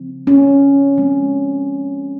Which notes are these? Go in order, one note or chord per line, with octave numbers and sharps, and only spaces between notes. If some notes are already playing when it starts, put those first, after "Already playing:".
Already playing: C#3 F3 C4
C#4
F3 G#3 C4